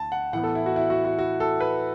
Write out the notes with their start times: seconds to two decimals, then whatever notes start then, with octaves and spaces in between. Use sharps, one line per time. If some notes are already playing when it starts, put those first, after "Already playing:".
Already playing: D2 A5
0.12 F#5
0.33 A2 E3 B3 F#5
0.44 A4
0.55 E4
0.66 F#4
0.76 E4
0.90 F#4
1.05 F#4
1.19 F#4
1.40 A4
1.61 B4